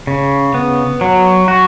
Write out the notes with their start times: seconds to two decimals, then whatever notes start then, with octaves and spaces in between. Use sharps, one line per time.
0.07 C#3
0.54 B3
1.01 F#3
1.48 F#4